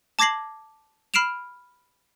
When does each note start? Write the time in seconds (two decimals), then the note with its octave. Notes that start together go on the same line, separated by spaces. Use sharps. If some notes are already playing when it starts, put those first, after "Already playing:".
0.19 A5 D6 G#6 A#6 C7 F#7
1.14 B5 F6 C7 D7 E7 F7